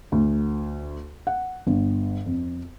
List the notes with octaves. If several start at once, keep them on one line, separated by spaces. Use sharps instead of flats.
D2
F#5
G1
F2